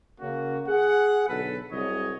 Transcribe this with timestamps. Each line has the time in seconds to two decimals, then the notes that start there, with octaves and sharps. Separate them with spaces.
0.20 C#3 A#3 C#4 F#4
0.67 G#4 F#5
1.28 B1 B2 D3 A4 B4
1.71 C2 F#3 G#4 C#5 D#5